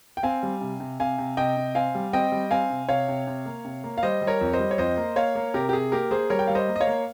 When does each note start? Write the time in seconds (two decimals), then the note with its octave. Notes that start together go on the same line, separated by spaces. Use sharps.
0.17 G5
0.23 C4 F5 G#5
0.43 G3
0.61 C3
0.80 C3
1.00 C3 F5 G#5
1.18 C3
1.37 C3 D#5 G5
1.57 C3
1.75 C4 F5 G#5
1.95 G3
2.13 C4 D#5 G5
2.32 G3
2.51 C4 F5 G#5
2.70 C3
2.88 C3 C#5 F5
3.08 C3
3.27 C3
3.46 A#3
3.65 C3
3.84 A#3
3.98 F5
4.03 G3 C5 D#5
4.22 G3
4.27 A#4 C#5
4.41 F2
4.53 C5 D#5
4.59 G3
4.71 C#5
4.78 F2 C5 D#5
4.97 A#3
5.16 A#3 C#5 F5
5.35 A#3
5.54 C3 G4 A#4
5.69 G4
5.73 C3 G#4
5.92 A#3 G4 A#4
6.11 A#3 G#4 C5
6.30 G3 A#4 C#5
6.39 G5
6.47 G3 F5
6.55 C5 D#5
6.68 A#3
6.76 D#5
6.81 C#5 F5
6.87 A#3